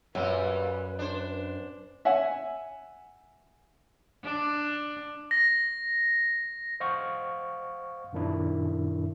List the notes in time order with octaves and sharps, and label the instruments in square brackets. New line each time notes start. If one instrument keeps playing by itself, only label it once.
[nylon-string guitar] F#2 [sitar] A#2 G3 [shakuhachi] B4
[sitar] D4 C5
[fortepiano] E5 F#5 G#5
[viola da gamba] D4
[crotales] A#6
[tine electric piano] C5 D#5 F5 F#5 C#6
F#2 A#2 D#3 D4 E4